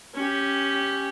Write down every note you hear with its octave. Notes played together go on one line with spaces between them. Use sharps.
C#4 G4